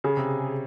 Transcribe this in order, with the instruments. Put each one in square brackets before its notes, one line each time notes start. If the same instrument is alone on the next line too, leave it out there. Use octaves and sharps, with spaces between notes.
[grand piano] C#3 [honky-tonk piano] G#4
[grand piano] C3